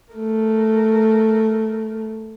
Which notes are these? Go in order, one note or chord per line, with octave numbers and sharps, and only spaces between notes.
A3 A#4